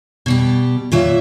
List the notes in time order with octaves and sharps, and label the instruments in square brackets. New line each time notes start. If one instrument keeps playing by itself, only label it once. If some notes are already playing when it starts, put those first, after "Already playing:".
[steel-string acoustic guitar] B2 G3 G4
[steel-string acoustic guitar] A#2 F#3 E5 [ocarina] F4